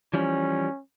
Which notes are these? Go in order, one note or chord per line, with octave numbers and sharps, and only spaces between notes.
E3 F3 G3 C#4